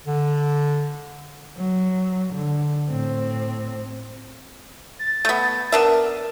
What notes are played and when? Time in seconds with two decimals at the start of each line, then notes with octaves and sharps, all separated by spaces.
0.07 D3
1.58 F#3
2.33 D3
2.90 A2 C4
4.99 A6
5.25 A3 B3
5.72 B3 D4 A#4 E5